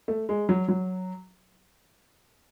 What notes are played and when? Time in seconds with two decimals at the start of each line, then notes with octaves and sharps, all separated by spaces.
0.08 A3
0.29 G#3
0.49 F#3
0.68 F#3